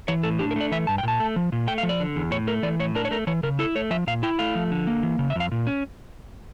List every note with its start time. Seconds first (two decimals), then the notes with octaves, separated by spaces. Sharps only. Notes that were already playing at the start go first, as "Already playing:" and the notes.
0.08 E3 C#5
0.23 A2 A4
0.39 D4 G4
0.51 A#4
0.56 A3 D5
0.72 E3 E5
0.87 G2 A5
0.98 G5
1.03 A#2 A5
1.20 A3
1.36 F3
1.52 A#2
1.67 A3 G5
1.78 F5
1.83 F3
1.89 D5
2.00 D3
2.16 E2
2.31 A2 C#5
2.47 A3 A#4
2.63 E3 D5
2.80 A2 C#5
2.95 D4 A#4
3.05 C#5
3.11 A3 A#4
3.27 E3 C#5
3.43 C#3 A#4
3.59 E4 A4
3.75 A3 C#5
3.91 F3 E5
4.07 A#2 F5
4.23 E4 G5
4.39 A3 F5
4.55 F3
4.71 D3
4.87 A#3
5.03 E3
5.19 C#3
5.30 E5
5.35 F2 F5
5.51 A#2
5.67 C#4